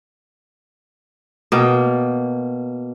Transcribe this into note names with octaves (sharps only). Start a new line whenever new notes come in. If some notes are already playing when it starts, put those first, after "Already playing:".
B2 A#3 G5